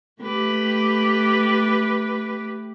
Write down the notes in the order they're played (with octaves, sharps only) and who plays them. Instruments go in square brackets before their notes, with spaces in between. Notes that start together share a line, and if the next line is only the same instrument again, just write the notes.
[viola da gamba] A3 G4 B4